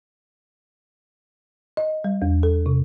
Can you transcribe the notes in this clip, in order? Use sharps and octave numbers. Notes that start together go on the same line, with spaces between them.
D#5
G3
E2
A4
C3